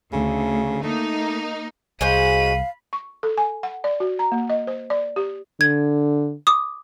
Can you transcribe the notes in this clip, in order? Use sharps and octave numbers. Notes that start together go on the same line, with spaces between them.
D2 C#3
A3 A#3 D#4
C2 G#3 F#4 C5 F5 B5 D#7
C#6
A4
G#5
F#5
D5
F#4
A#5
A#3
D#5
C5
D5
G4
D3 G#6
D6 D#6